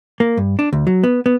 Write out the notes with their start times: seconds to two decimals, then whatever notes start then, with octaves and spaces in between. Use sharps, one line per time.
0.20 A#3
0.37 G2
0.59 D4
0.73 D2
0.87 F#3
1.03 B3
1.26 B3